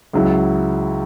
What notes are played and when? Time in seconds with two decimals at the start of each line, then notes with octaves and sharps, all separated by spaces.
0.13 C#2 C#3 F#3 E4